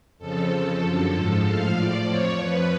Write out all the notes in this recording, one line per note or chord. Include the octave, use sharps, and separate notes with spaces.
F2 C#3 F3 A4
F2 C#3 F3
F#2 D3 F3
G#2
F3
A2 F3 F5
A2 F3 D5
F2 F3 C#5
F2 F3 B4